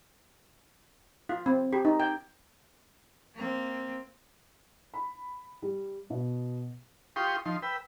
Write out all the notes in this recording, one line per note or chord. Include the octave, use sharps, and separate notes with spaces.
F4
C4
G4
D#4
G5
A#3 C4
B5
G3
B2
F4 G4 G5 C6 C#6 D#6
F3 D#4 C6
B4 G5 E6